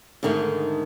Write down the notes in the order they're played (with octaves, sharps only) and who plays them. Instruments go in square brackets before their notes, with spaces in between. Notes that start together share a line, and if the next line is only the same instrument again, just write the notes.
[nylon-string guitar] G#2 D3 D#3 G#3 A3